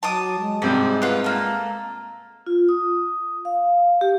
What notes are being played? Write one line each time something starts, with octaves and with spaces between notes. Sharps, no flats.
F#3 A5 D6 D#6
G#3
G#2 C3 G3 C5
B3 F4
A#3 A4
F4
D#6
F5
G4